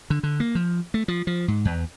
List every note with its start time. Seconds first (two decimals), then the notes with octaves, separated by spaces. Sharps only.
0.10 D3
0.23 D3
0.40 A#3
0.55 F3
0.94 A3
1.08 F3
1.27 F3
1.48 G#2
1.65 E2